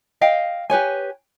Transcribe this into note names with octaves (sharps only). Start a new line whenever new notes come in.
D#5 F5 G5
G4 B4 C#5 G#5